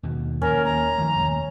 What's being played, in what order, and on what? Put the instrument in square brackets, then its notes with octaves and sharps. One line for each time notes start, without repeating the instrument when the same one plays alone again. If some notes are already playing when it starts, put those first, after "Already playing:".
[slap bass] D#2 B2
[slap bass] D#2 A#2 [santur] C#4 [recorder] A#4
[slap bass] D#2 [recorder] A#5
[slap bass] D#3 F3 A3
D#1 B1 D#3